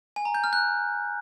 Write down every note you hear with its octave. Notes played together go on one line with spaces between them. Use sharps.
G#5
A#5
G6
F6
F#6